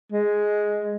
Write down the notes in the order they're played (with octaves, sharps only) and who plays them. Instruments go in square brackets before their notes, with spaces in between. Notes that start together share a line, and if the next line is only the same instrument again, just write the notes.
[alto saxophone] G#3